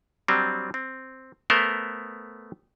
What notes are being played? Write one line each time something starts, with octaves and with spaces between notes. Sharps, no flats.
F#3 G3 C4 D4
C4
A3 B3 A#4 C5 E5